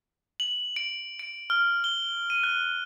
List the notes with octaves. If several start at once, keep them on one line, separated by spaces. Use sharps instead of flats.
F#7
D7
D7
F6
G7
D#7
F#6